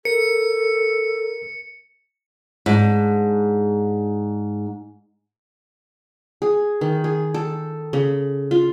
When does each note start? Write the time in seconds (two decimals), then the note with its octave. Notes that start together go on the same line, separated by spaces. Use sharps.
0.05 A4 A#4 C#7
2.66 G#2 D4
6.42 G#4
6.81 D#3
7.04 G#4
7.34 A4
7.93 C#3
8.51 F4